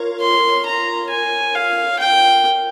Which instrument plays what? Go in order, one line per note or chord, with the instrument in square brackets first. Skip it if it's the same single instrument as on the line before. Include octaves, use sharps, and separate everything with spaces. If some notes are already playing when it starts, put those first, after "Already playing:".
Already playing: [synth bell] F4 A#4 C#5
[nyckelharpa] C6
A#5
G#5
F5
G5